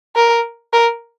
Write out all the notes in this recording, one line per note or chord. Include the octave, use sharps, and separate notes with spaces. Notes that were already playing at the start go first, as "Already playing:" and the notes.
A#4
A#4